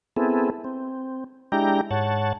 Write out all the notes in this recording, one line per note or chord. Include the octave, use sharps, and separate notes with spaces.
B3 C4 E4 G#4 A4
C4
G#3 D4 E4 G4 G5 A#5
G#2 C#5 F#5 A5